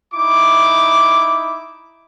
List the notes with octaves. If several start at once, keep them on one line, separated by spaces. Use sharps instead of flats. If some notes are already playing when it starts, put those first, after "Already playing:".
D#4 E4 D6